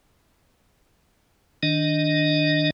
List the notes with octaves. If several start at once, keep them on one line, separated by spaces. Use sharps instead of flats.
D#3 D4 D#5